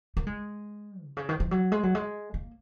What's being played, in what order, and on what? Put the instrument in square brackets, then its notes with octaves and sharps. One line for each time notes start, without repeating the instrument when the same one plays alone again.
[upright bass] A#3
G#3
C3
C#3
D#3
F3
F#3
G#3
F#3
G#3
A#3